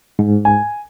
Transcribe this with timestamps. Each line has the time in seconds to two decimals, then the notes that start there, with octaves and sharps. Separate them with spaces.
0.19 G#2
0.45 G#5